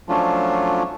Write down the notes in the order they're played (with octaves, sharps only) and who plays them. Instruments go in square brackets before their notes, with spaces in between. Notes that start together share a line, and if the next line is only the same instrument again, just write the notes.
[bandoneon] F3 F#3 A3 C#4 D4 F4